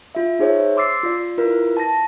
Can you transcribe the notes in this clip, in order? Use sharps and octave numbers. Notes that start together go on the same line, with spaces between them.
F4 E5
D#4 G#4 C5 C#5 E5
C6 D6 E6 A6 C7
F4 D5
E4 F4 A#4 B4
A5 A#6